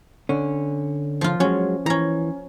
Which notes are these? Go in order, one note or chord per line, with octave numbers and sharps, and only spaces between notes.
D3 C#4
F3 F4
F#3 G#3 C#4
E3 C#4 A#5